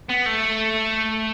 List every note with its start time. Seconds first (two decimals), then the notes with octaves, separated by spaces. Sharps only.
0.09 B3
0.26 A3